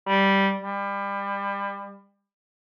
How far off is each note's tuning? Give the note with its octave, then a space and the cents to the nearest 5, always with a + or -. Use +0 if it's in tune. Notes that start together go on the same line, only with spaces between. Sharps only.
G3 -5
G3 +30